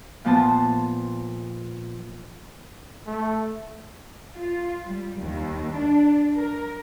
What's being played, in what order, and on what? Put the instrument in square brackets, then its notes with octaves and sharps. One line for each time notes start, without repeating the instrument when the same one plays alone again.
[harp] A#2 F3 B3 C5 A5
[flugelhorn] A3
[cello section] F4
G3
D#2
D4
A#4